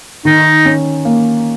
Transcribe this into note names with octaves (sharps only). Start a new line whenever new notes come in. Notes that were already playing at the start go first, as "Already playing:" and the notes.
D#3 D#4
C#4
A#3